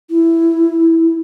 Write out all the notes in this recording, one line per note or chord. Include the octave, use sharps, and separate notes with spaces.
E4